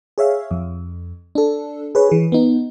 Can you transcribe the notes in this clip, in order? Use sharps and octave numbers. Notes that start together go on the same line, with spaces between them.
G#4 C#5 E5 F5
F2
D4 A4
G#4 B4 C#5
E3 G#4
B3 D#4